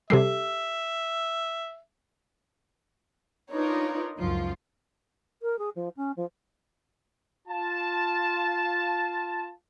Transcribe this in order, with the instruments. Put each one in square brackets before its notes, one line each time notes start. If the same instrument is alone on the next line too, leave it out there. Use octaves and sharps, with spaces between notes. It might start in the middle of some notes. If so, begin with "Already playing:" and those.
[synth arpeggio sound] C3 G3 [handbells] G4 A4 C7 [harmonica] E5
[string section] D4 D#4 F4 A#4 B4 C#5
C#2 F#2 F3 F4
[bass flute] A#4
G#4
F3
C#4
F3
[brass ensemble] F4 A5